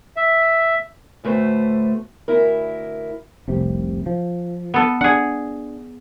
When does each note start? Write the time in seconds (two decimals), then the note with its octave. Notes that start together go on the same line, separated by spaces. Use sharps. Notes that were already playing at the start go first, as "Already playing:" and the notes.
0.17 E5
1.24 D2 A2 A3 B4 C5
2.28 D2 E4 A#4
3.48 F1 C2 C3
4.06 F3
4.74 B3 A4
5.01 D4 G#4 F#5